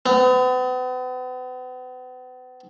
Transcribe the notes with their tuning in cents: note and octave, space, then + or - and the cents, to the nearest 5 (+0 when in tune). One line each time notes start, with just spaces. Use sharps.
B3 +40